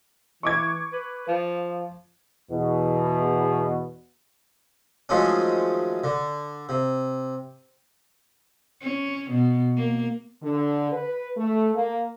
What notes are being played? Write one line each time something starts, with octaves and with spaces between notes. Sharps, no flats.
E3 C#6 D6 G#6
B4
F3
E2 B2
D#3 F3 F#3 G#3 A3 C#4
D3
C3
C#4
B2
A#3
D3
B4
A3
A#3